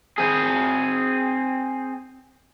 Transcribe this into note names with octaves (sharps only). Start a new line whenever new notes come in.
C4 G#4